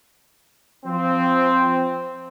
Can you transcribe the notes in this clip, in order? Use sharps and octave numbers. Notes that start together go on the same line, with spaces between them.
F3 C4